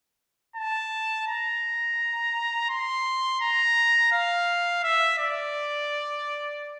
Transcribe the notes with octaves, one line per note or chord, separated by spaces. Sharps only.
A5
A#5
C6
A#5
F5
E5
D5